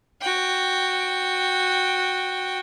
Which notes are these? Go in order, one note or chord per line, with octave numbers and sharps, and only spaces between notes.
F#4 G5